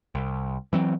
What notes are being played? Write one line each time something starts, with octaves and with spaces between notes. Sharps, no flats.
C2
E3 F#3 C4